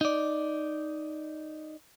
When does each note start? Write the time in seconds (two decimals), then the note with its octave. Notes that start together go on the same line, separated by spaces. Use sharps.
0.01 D#4 D5